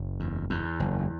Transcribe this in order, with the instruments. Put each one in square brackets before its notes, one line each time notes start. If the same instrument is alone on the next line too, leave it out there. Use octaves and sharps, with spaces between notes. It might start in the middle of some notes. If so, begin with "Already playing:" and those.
Already playing: [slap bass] F#1
E2
E2
F#1